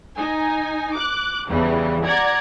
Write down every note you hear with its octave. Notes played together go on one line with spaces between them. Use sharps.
D#4 G#5
D6 F#6
E2 C#3 E3 G3
D5 F#5 A#5 G#6